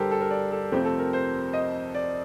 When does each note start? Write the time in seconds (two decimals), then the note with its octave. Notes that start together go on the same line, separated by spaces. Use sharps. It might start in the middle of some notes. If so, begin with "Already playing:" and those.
Already playing: G2 D3 G4 A4 A#4 C5
0.11 A4
0.21 A#4
0.31 D5
0.52 A4
0.72 F2 C3 F3 A3 C4 G4
0.85 A4
0.99 A#4
1.13 C5
1.53 D#5
1.94 D5